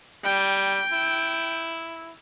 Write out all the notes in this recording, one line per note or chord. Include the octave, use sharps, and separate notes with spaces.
G3 G5
E4